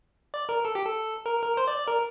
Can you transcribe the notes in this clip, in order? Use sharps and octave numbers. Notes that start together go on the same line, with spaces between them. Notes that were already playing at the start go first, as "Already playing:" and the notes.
D5
A#4
A4
G4
A4
A#4
A#4
C5
D5
D5
A#4